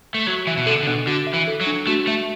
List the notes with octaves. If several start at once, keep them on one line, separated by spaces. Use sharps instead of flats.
A3
F#3 F#4
E3 E5
B2
D3 A4
D3
B2 D4
D3 F#4
E5
E3
A4
F#3
D4
A3 F#4
A3 E5